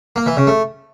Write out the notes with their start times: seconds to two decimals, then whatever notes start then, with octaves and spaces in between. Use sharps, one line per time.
0.16 A#3
0.26 E3
0.37 C#3
0.47 A3